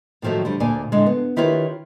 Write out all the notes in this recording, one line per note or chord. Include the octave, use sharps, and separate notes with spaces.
A2 D#3 F3 F#3 A3
D3 G3
D2 A#2 D5 G#5
A2 D3 G#3
B3
D#3 E4 F4 G4 B4 C#5